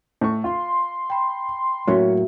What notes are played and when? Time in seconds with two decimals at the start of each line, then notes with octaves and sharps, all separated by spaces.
0.21 A2 C#6
0.44 F4 C6
1.10 G5 B5
1.88 A2 F#3 A#3 C#4 F#4 E5